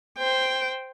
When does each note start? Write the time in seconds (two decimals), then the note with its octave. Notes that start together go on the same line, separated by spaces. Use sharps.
0.18 C5 G5